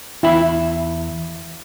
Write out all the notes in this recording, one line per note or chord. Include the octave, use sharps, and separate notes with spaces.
E2 E4 E5 B5